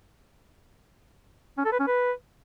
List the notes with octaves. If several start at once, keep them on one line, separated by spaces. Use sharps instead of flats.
C#4
A4
B4
C#4
B4